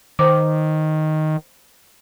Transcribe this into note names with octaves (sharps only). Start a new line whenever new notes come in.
D#3 C5 D6